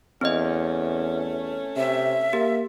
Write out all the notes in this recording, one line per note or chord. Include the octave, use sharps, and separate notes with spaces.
E2 A3 C4 C#4 D#5
C3 E5
A#3 G4